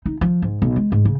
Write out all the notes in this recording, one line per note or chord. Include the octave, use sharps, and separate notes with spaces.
D#4
F3
G#2
B1
G#3
G#2
C#3